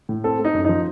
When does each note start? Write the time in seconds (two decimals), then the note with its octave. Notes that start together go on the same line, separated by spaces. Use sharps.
0.09 A2
0.24 C4 A4
0.39 A3
0.44 D#4
0.54 F#2
0.65 F3 D#4